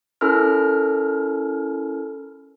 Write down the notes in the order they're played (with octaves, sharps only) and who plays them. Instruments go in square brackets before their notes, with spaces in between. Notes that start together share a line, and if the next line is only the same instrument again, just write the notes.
[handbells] C#4 E4 A4 A#4 F6